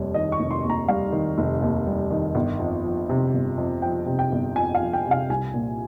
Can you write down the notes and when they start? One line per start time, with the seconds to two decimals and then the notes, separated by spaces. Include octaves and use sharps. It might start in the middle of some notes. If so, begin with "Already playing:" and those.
Already playing: F1 D#2 G3 C#5
0.14 D#3 D#5
0.32 C#6
0.39 F1
0.51 C6
0.64 D#2
0.70 A#5
0.88 G3 F5
1.12 D#3
1.38 F1
1.62 D#2
1.87 G3
2.11 D#3
2.35 G1
2.59 F2
2.84 F3
3.09 C3
3.33 G1
3.58 F2
3.82 F3 G5
4.06 C3
4.19 G5
4.32 G1
4.56 F2 G#5
4.75 F5
4.80 F3
4.93 G5
5.06 C3
5.11 F5
5.29 C2 G#5
5.54 A#2